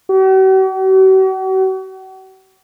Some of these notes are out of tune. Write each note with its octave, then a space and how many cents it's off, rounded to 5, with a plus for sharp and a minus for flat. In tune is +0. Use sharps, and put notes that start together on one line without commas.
F#4 +45